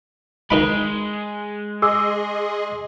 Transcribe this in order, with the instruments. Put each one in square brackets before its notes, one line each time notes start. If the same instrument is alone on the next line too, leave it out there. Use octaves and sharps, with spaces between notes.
[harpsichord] D#3 D#4 B5 [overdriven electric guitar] G#3 [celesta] D7
[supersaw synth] G#4 D#5 C6 [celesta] D6 E6